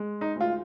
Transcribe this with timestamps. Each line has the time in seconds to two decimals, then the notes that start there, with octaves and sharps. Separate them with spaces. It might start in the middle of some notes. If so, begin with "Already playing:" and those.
Already playing: G#3
0.21 D#4
0.35 D2
0.41 F4